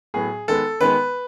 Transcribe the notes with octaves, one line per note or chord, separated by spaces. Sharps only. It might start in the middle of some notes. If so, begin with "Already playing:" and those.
A2 F#3 B3 G#4
D#3 G#3 B3 A4
D#3 G#3 B3 B4